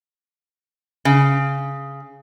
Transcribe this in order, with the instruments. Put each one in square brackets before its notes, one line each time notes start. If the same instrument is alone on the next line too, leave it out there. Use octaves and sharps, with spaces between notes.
[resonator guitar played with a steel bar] C#3